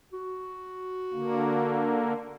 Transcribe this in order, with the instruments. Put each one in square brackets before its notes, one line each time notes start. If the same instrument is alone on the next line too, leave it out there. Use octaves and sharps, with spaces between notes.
[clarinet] F#4
[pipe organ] D3 A#3